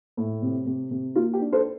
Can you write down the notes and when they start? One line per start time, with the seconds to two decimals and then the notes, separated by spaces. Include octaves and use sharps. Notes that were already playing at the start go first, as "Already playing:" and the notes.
0.17 A2
0.42 C3
0.66 C3
0.91 C3
1.16 A#3 F4
1.34 G4
1.40 D4
1.52 A4 C5